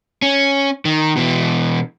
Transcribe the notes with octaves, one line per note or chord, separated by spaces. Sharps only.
C#4
D#3
B2 E3